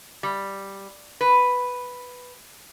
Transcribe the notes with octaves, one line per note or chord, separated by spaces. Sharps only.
G3
B4